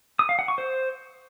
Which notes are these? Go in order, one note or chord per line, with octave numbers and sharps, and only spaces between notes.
D#6
F5
F#5
C#6
C5